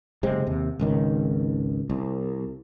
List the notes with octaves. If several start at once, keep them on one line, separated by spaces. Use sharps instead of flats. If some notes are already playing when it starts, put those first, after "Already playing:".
F#1 C3 G#3 C4
D#2 C3
G#1 C#2 D#3
C2